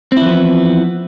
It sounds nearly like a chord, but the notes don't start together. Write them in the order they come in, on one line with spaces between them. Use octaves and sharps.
C4 E4 E3 F3 B3